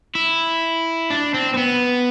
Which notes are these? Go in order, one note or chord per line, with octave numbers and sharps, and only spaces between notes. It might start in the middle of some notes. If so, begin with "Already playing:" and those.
E4
D4
C4
C4
B3